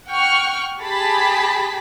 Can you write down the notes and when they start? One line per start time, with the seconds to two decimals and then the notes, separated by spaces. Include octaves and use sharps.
0.11 F#5 G5 C#6 F6
0.82 G4 G#4 A5 B5 B6